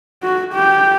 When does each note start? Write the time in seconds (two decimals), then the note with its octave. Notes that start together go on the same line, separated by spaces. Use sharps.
0.23 F#4
0.54 G4